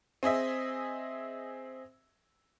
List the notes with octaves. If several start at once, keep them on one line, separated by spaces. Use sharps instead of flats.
C4 G#4 D#5 E5